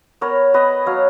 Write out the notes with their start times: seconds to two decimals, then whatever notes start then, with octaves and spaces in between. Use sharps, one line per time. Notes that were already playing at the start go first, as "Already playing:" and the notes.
0.21 B3 A#4 C#5
0.54 B3 B4 D#5
0.86 F#3 C#5 F5